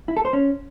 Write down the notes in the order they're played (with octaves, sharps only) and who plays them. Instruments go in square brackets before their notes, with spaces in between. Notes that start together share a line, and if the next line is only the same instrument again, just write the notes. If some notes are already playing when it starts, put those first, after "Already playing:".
[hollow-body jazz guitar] E4
A4
C5
C#4